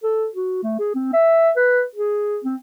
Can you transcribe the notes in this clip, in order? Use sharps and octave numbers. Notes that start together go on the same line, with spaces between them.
A4
F#4
A3
G#4
C4
E5
B4
G#4
C4